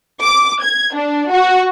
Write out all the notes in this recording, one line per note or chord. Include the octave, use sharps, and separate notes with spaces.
D6
G#6
D4
F#4